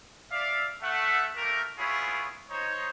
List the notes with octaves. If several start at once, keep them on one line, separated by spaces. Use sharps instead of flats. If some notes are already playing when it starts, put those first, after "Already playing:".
D5 E5 F5
A3 E5 F#5
A3 A#3 G4 A#4
B3 C#4 E4 F4 G#4 C#5
D#4 C5 C#5